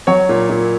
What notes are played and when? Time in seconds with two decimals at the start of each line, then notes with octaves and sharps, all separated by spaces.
0.07 F#3 C#5
0.29 A#2
0.50 A#2